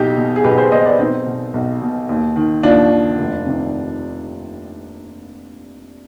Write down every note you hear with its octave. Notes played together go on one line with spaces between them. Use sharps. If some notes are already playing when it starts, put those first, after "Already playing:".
Already playing: B1 D#4 G4
B2
G#4
B1 G4 B4
G#4 C5
B2 C5 D#5
B4 D5
B1 C4 D#4
B2
B1
B2
D#2
D#3
D#2 D4 F4
D#3
F1
C3 D#3